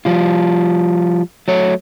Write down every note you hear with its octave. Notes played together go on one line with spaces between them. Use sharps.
F3 G3 F4
F#3 A3 C#5